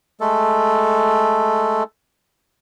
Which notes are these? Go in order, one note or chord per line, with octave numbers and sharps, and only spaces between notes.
G#3 A3 A4